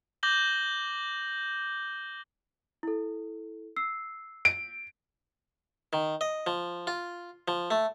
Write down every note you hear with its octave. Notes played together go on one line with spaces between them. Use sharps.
D6 G6 A#6 F#7 G7
E4 A4
E6 C7
D7
D#3
D#5
F3
F4
F3
A3